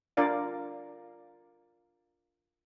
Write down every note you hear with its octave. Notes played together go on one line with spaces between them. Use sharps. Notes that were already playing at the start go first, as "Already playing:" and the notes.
D4 F4 A#4 D5 F5